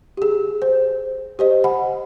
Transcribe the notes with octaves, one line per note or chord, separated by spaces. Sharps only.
G4 G#4
C5
G4 C5 D#5
F#5 G#5 B5